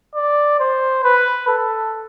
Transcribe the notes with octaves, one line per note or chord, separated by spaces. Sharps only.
D5
C5
B4
A4